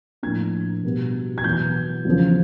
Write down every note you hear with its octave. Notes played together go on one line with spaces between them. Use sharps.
A2 F3 A#3 D4 G#6
B2 G3 B3
G#6
E2 B2 F#3 G6
E2 C#3 F3